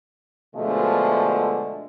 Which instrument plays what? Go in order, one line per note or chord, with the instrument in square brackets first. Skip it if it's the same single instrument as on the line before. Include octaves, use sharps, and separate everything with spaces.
[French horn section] B2 D3 F3 G#3 A3